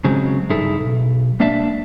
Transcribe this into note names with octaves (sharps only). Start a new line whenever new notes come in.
C#3 F#3 G#3 C4
G2 D#4 E4 G#4 A4
B1
G#3 A#3 D4 D5 E5 A5